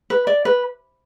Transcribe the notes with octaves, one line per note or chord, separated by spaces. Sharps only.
B4
D5
B4